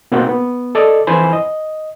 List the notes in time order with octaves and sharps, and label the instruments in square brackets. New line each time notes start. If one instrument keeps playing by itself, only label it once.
[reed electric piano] B2 A#3 C4 D#4 F#4 G5
B3
A4 D5 D#5
F2 E3 C5 G#5 B5 C6
D#5